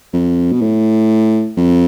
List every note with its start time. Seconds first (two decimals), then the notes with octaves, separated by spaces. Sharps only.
0.13 F2
0.52 B2
0.61 A2
1.57 F2